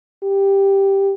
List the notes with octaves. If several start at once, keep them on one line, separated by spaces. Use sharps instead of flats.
G4